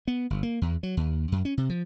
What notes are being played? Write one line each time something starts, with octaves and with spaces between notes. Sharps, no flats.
B3
G1
A#3
E2
F#3
D#2
F#2
C#4
C3
F3